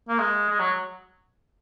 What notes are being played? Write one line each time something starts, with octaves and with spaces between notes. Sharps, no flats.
A#3
G#3
G#3
F#3